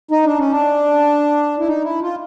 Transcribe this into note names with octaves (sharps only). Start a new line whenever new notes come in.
D#4
D4
C#4
D4
E4
D#4
E4
F4